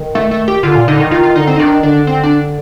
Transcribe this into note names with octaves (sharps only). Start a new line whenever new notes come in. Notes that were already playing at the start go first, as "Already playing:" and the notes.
Already playing: D#3
A3
A3
G4
D3 F4
A#2
D3 D#4
D#3
D#3 F4
F4
D3 D#4
C4
D#4
D#3 D4
D3 D4
C4
D4